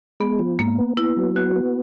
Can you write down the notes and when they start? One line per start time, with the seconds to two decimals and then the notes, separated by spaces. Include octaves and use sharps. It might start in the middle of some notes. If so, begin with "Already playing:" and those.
0.20 G#3 B3
0.39 F3
0.59 G#2 A#3
0.78 B3
0.97 B3 E4
1.17 F#3
1.36 B3 F#4
1.56 B3